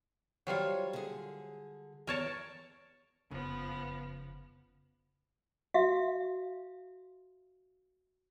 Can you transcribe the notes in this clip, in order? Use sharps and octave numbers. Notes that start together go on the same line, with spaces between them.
F#3 G3 F4 C5 C#5
D3 G#4
E2 A#4 C#5 A5
F#1 F2 C#3 F3 B3
F#4 E5 F5